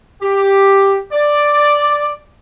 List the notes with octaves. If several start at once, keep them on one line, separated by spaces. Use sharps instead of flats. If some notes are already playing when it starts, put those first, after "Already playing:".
G4
D5